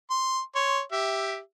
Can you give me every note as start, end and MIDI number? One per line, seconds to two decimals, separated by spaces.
0.10 0.41 84
0.55 0.81 73
0.55 0.81 84
0.92 1.38 67
0.92 1.38 76